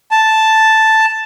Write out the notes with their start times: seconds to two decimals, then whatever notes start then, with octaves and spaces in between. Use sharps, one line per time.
0.11 A5